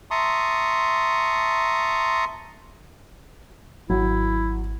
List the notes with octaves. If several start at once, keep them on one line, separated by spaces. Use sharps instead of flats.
E5 A5 A#5 C6 C#6 D#6
G#1 F#3 E4